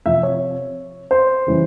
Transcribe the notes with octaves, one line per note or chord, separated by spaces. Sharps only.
C3 F3 C4 E5
C#5
C5
C#3 E3 G3 C#4